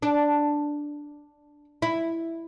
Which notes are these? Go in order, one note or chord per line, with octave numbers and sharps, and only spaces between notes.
D4
E4